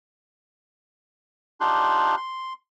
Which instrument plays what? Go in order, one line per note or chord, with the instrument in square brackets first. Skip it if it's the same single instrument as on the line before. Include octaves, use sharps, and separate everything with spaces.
[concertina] D4 D#4 F4 G4 C6 F#6
C6